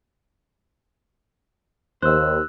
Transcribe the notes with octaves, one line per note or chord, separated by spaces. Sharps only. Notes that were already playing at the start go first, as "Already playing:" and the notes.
D#2 C5 E6 F#6